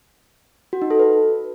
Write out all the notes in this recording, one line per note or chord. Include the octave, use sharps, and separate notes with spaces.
F#4
D#4
A4
B4